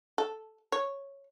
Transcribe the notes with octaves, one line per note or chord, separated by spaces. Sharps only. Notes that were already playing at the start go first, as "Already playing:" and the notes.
A4
C#5